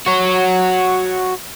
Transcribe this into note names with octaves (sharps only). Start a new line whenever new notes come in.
F#4 C#5